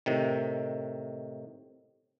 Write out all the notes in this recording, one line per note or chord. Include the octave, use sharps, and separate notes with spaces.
A2 C3 D#3